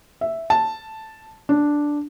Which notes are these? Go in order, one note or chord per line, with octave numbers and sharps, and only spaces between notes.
E5
A5
D4